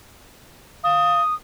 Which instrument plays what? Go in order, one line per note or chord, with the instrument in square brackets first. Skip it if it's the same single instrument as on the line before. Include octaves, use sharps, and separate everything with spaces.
[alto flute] F5 [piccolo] D#6